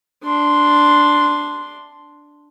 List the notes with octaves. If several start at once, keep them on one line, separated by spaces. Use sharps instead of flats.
D4 C6